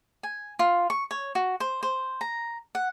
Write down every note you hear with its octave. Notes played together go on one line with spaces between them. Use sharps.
G#5
F4
C#6
C#5
F#4
C5
C5
A#5
F#5